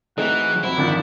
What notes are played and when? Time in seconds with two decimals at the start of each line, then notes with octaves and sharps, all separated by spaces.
0.18 E3 A3 C4 D#4 F#4 G#4
0.63 F2 E4 F#4 C5
0.77 G#1 D3 D#3 F3 D4 C#7